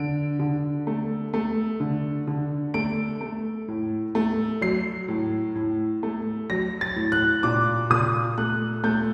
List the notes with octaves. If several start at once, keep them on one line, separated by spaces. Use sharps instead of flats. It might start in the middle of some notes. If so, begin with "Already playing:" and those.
Already playing: D3 D7
D3
A3
A3
D3
D3
A3 D7
A3
A2
A3
F#3 C7
A2
A2
A3
F#3 A#6
A6
A2
F#6
A#2 D6
A#2 D#6
A3 F#6
A3 G6